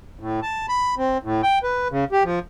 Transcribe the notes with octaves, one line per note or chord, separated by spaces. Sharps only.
A2
A5
B5
C4
A2
G5
B4
C#3
G4
F3